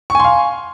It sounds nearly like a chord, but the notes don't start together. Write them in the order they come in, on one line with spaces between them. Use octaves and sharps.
C#6 G#5 C6 F5